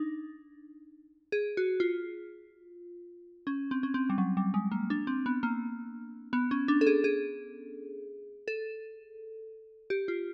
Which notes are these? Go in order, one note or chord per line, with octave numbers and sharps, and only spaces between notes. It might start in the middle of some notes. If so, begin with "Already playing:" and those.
Already playing: D4 D#4
G#4
F#4
F4
C#4
C4
C#4
C4
G3
F#3
G3
G#3
A#3
D4
C4
B3
A#3
B3
C#4
D4
A4
G#4
G#4
A4
G4
F4